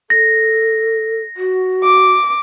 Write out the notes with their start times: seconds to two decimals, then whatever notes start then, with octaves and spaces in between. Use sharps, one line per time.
0.10 A4 A#6
1.37 F#4
1.84 D6